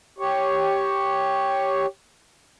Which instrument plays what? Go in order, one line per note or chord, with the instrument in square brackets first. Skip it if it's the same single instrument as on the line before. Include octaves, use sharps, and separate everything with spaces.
[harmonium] G4 C#5